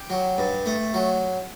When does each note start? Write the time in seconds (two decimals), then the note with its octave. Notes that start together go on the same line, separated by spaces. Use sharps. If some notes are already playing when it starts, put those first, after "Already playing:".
Already playing: G4 G5
0.10 F#3
0.38 G2
0.66 A3
0.94 F#3